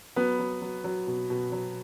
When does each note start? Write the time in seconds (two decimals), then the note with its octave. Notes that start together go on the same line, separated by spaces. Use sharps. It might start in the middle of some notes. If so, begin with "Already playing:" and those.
0.16 F#3 B3 B4
0.39 F#3
0.62 F#3
0.84 F#3
1.07 B2
1.30 B2
1.52 F#3